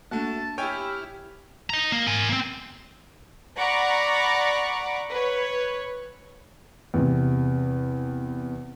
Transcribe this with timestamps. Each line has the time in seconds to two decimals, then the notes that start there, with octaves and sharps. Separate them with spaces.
0.11 A3 A#3 D4 F#4 A5
0.58 E4 G4 C#5 G5 G#5 F6
1.70 D#5 A#5
1.92 A#3
2.07 A#4 G#5
2.29 A#3 C4
3.57 D5 F#5 A#5 B5 C#6 D6
5.10 B4 C#5
6.94 E2 C3